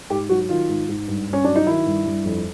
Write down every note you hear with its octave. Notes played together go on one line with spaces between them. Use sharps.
G#2 G4
F#3 F#4
D#3 F4
G#2
G#2
G2
G2
C#4
F#3 D4
D#4
D#3 E4
G2
G2
F2